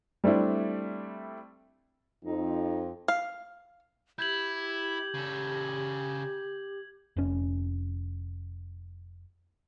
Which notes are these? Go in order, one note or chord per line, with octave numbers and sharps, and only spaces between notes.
G3 A3 C4 D4 E4
F2 D#4
F5
E4 G4 G6 G#6 F#7
C#3 A4
F1 C#4